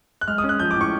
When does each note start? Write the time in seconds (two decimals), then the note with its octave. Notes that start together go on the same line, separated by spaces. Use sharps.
0.21 F#6
0.28 G#3 F6
0.38 D#6
0.44 C#4
0.49 F#6
0.59 F3 G6
0.71 D6
0.76 A2 C#6